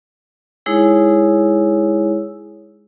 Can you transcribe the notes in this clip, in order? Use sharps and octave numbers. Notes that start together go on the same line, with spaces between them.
G#3 D#4 E4 G#4 C#5 E6